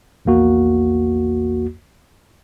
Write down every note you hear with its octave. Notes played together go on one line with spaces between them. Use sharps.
A#1 E2 A#3 F#4